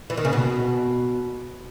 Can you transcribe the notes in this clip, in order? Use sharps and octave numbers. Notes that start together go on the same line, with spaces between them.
E3
D#3
C#3
B2